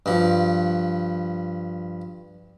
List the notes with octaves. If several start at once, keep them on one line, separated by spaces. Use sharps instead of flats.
G2 F3